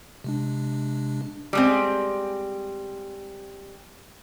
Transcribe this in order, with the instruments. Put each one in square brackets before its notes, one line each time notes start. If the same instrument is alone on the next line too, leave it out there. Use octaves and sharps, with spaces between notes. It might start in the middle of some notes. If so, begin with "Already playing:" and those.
[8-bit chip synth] C3 G#3 D4
[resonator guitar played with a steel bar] G3 G#3 C4